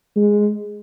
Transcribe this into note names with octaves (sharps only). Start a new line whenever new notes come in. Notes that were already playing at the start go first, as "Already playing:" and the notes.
G#3